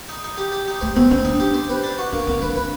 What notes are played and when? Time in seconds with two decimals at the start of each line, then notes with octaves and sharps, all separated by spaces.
0.09 D#4
0.24 D#4
0.38 G4
0.52 G4
0.68 D#4
0.81 A3 C5
0.96 B3 C4
1.10 C4 C#4
1.25 D4 D#4
1.40 G4
1.54 C5
1.69 B4
1.83 D4
1.98 F#4
2.12 A#3 D4
2.27 A#3 C4
2.42 D4 B4
2.56 D4 B4